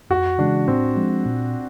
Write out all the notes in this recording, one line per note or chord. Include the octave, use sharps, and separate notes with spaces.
F2 F#4
C#3 E3 G#3 D4
A2 C4
F3 G#3
A#2